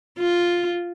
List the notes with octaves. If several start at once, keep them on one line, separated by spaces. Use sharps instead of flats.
F4